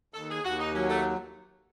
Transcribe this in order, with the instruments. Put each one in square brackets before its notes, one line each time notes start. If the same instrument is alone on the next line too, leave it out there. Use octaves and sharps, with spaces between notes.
[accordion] D#2 [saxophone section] A4
[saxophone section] G#4
[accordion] D#2 [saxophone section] F#4
[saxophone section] D#4
[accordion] F#3 [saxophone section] C#4
[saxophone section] A3